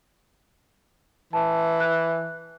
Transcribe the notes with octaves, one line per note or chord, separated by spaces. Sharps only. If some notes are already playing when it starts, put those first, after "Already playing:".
E3 A5
F#6